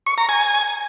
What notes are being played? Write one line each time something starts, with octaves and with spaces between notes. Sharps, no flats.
C#6
A#5
G#5